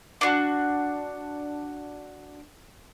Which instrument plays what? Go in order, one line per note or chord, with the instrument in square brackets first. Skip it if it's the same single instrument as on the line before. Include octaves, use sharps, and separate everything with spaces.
[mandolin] D4 F#4